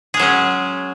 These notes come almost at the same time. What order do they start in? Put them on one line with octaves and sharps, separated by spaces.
G#4 G#3 F#3 C#4